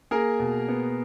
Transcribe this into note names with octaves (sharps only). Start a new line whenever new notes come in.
A#3 G#4 A#4
B2
B3